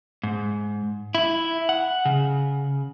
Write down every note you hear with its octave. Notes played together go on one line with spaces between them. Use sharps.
G#2
E4
F#5
C#3